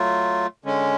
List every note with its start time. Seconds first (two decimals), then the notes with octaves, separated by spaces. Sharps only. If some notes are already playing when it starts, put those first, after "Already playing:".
Already playing: F#3 A3 F4
0.65 D3 G#3 C#4